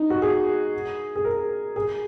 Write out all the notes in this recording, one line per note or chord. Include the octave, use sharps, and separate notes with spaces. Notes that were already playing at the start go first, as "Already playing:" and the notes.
Already playing: D#4
F#4
G#4
G#4
A#4
G#4